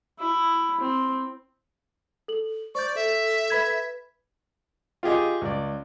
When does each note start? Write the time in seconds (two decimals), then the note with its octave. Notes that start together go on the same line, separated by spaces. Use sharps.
0.19 E4
0.80 C4
2.28 A4 F#7
2.75 C5 D5 C#6 G6
2.96 A4 E5
3.50 B4 B5 G#6
5.03 F4 G4 G#4 D#5
5.41 C#2 D5